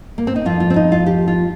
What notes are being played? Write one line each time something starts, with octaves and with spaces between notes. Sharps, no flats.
A#3
C4
D#4
F2 F3 F4
F4
C4
D#4
F4
G4
F4